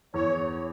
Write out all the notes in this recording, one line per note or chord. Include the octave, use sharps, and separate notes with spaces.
E2 C#5